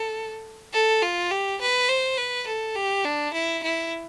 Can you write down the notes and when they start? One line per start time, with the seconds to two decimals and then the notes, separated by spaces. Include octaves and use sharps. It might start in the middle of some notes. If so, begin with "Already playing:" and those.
Already playing: A4
0.73 A4
1.02 F4
1.31 G4
1.61 B4
1.89 C5
2.18 B4
2.47 A4
2.76 G4
3.05 D4
3.33 E4
3.63 E4